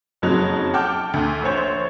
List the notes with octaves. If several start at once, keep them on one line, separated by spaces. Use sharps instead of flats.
F#1 F2 F#3 D#4 F#6 F7
F#5 G5 A5 D6 F6 G6
D2
A#1 C5 C#5 G6